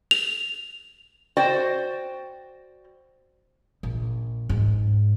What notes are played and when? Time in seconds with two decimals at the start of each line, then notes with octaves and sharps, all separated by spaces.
0.11 F7
1.37 F#4 C5 D5 G5
3.83 A#1
4.49 G#2